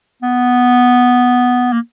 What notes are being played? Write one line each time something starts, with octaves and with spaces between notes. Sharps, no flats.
B3
A#3